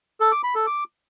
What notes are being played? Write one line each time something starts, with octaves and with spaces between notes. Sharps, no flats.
A4
D6
B5
A4
D6